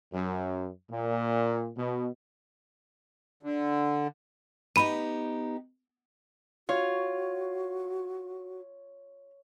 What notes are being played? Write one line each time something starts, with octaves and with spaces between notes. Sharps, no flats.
F#2
A#2
B2
D3
B3 D#4 G4 B5 D#7
F4 F#4 C#5